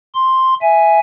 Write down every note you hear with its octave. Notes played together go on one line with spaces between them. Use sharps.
C6
E5 G#5